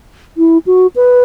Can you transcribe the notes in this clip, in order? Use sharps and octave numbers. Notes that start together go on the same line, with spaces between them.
E4
F#4
B4